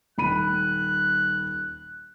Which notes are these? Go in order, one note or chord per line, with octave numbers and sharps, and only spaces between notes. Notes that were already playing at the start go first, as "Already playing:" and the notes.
D#1 B5 F#6 D#7